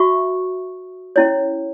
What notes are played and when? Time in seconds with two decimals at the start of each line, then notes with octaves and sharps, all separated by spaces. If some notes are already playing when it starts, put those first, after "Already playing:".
Already playing: F#4 E5 C#6
1.16 C#4 E4 C#5